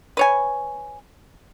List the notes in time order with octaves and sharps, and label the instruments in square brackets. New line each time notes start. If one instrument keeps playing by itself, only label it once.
[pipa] B4 C#5 G#5